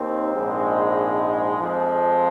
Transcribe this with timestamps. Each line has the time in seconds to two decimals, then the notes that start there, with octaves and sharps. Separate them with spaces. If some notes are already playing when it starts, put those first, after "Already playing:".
Already playing: D#2 D#3 C4
0.33 A#1 G#2 G#3
1.57 F2 F3 G#3